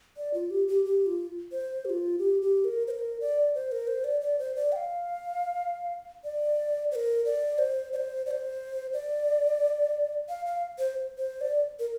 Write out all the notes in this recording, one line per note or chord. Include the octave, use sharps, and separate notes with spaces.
D5
F4
G4
G4
G4
F4
C5
G4
F4
G4
G4
A#4
C5
A#4
D5
C5
A#4
C5
D5
D5
C5
D5
G5
F5
D5
C5
A#4
D5
C5
D5
C5
D5
C5
D5
F5
F5
C5
C5
D5
A#4